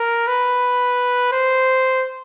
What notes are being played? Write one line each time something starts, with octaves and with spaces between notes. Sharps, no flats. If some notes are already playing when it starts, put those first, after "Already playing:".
Already playing: A#4
B4
C5